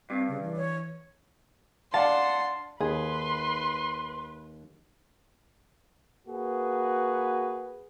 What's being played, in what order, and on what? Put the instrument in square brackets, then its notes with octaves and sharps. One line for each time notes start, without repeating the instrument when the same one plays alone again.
[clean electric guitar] G2 [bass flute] C4
[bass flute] C#3
E3
[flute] C#5
[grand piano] D4 D5 F5 [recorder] F#5 [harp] A5 [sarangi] C6
[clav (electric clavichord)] D#2 [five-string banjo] G#4 [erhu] B4 [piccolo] C6
[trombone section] A#3 F#4 G#4 B4